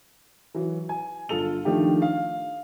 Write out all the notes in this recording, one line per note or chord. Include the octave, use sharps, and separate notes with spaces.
E3 F#3
G#5
G1 F4 A4 F7
D#3 F3 A3 D4 G4
F5